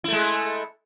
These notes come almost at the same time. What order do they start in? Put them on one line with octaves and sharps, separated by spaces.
E4 A3 G#3